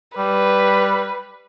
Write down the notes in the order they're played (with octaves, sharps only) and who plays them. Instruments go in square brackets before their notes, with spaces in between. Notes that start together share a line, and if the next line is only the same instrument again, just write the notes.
[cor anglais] G3 [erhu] B4